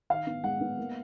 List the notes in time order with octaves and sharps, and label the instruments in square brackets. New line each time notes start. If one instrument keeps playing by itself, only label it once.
[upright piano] D#3 [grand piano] F5
[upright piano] B3
[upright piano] G#3 [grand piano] F#5
[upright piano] B3
A#3